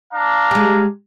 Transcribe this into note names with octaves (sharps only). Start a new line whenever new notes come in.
D4 F5 A#5
G#3 G4